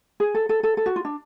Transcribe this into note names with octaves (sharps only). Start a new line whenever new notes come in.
G#4
A4
A4
A4
A4
F#4
F4
D4